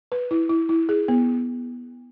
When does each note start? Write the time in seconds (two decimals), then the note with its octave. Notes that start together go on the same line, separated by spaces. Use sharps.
0.12 B4
0.31 E4
0.50 E4
0.69 E4
0.89 G#4
1.08 B3